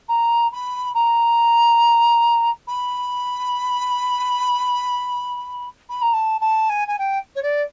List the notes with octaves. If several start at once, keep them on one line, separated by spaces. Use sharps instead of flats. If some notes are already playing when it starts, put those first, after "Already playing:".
A#5
B5
A#5
B5
B5
A#5
A5
A5
G#5
G#5
G5
C#5
D5